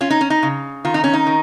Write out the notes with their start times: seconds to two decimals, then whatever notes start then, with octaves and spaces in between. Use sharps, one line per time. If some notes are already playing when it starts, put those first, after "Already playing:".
0.01 C#4 F4
0.10 D#4
0.21 C#4
0.30 D#4
0.43 C#3
0.85 D#3 F4
0.94 D#4
1.04 C#4
1.13 D#4
1.27 D#3